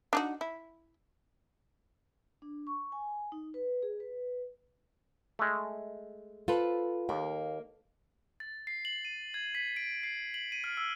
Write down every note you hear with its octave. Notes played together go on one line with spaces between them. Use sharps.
D4 D#4 F#4
E4
D4
C#6
G#5
D#4
B4
G#4
B4
G#3 A3
F4 A4 B4 C5
D#2 A#3
A6
C7
F#7
D#7
G#6
B6
D7
C7
F#7
D#7
F6
E6